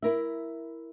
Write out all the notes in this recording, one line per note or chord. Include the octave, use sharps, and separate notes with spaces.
E4 A#4 E5